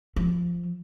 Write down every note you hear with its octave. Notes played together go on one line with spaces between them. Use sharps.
F3